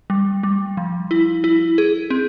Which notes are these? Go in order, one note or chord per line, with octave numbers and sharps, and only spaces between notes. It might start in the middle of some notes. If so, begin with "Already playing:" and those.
G3
G3
F3
E4
E4
G#4
C4